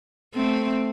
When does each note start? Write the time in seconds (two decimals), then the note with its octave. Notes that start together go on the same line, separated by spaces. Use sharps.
0.34 A3 C4